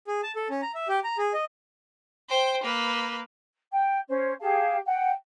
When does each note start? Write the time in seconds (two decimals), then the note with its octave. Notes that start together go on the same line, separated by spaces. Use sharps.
0.08 G#4
0.23 A5
0.36 A4
0.50 C#4
0.62 A#5
0.75 E5
0.88 G4
1.04 A#5
1.18 G#4
1.34 D#5
2.30 C5 G5
2.64 A#3 B4
3.70 G5
4.07 C#4 C5
4.40 G4 G#4 F5 A5
4.86 F#5 G5